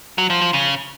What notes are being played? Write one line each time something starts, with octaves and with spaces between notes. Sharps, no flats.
F#3
F3
F3
C#3